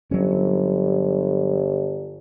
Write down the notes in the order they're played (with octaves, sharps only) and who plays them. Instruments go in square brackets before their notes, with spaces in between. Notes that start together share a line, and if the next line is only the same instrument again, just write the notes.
[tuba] G1 [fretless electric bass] F#3 C#4